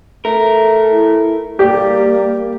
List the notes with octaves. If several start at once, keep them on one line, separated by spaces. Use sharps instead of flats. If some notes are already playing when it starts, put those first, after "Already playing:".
A3 A#4
E4
G3 A#3 G4